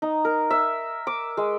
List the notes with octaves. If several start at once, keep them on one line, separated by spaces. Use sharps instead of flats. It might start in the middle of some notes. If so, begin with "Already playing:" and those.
D#4
A#4
E5
D6
G#3